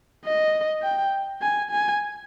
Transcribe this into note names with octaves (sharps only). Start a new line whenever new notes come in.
D#5
G5
G#5
G#5